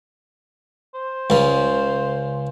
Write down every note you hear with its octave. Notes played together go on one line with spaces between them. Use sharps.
C5
C#2 C#3